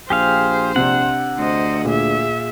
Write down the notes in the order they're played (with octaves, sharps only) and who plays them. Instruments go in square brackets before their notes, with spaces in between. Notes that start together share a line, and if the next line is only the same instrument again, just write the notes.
[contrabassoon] A#1 [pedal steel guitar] G4 G#4 F5 [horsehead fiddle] C5
[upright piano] C3 D4 [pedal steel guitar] F#5
[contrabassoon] D2 [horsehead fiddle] C5 D#5
[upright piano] A#2 [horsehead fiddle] G#4 E5